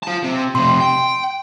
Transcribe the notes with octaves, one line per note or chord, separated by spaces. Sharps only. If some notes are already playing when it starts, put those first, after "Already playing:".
F4 A5
C3
F2 C3 C6
G5